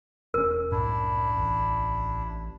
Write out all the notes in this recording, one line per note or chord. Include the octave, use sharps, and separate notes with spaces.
E1 C#4 A#4
C2 F#2 A2 D4 E4
A1